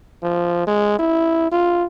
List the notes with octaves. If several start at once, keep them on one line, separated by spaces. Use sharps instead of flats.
F3
G#3
E4
F4